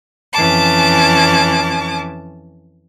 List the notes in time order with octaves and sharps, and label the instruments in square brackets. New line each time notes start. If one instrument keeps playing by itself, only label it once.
[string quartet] F2 E3 C#4 A5 D6